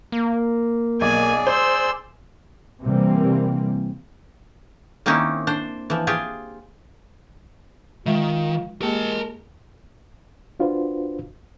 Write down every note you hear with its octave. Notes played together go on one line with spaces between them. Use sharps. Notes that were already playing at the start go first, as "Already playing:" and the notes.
A#3
B1 G#4 D5 G#5
C5 C6 E6
C3 E3 G3 A#3 C4
D#3 A#3 C4 C#4 D#4 E4
D4 C5
E3 F3
F4 G4 G#4
D#3 G#3 F4 E5
G#3 A#3 G4 A#4 A5
D4 F4 F#4 B4 C5